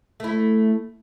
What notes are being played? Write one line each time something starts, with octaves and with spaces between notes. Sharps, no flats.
A3 E4